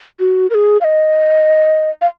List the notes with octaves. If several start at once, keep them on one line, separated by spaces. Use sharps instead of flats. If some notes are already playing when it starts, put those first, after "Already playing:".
F#4
A#4
G#4
F5
D#5
F5